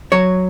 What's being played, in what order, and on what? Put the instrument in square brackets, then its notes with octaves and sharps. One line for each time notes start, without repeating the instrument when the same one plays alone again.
[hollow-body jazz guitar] F#3 C#5